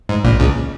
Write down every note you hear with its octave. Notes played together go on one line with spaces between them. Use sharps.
G#2
A#1 A#2
C#2 C#3